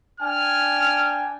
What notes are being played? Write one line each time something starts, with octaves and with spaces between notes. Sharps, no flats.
D4 G5 G#5 F6